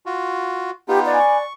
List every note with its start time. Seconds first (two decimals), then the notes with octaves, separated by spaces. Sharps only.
0.06 F4 F#4
0.88 B3 D#4 F4 G4
1.06 C#4 B4 D5 G#5
1.19 C#6